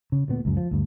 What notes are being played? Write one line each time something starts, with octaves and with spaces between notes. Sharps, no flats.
C#3
D2 A#2 B3
C#2 F#2
F3
D2 G2